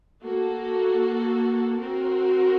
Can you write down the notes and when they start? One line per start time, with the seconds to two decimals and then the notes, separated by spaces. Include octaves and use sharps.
0.22 A#3 F#4 A4
1.79 C4 F#4 A#4